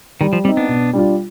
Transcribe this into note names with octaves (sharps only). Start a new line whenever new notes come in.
D#3 G3
F3
G3 C4 D#4
B3 D4
B2
G3 D4 F4